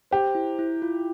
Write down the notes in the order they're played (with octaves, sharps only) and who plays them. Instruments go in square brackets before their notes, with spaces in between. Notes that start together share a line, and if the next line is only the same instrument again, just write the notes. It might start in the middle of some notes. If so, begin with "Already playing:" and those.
[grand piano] G4 [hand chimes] C5
[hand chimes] E4
E4
F4